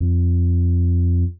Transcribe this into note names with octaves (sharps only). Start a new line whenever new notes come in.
F2